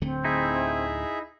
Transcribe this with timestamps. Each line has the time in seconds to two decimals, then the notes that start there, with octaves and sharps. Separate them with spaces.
0.01 D1 D3 A3 C4
0.25 D#4 E4 G#4 E5